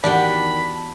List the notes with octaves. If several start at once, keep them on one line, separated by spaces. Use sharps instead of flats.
E2 D#3 D4 F#4 G4 G5 B5